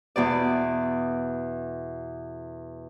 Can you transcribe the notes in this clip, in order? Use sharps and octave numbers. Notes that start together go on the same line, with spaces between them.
E2 B2 D5